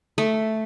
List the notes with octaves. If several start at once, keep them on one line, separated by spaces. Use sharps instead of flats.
A3